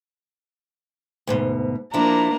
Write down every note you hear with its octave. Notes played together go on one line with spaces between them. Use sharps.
D2 G#2 B2
F3 A#3 D4 E4 A#5